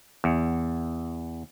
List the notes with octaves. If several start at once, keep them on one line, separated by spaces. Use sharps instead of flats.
E2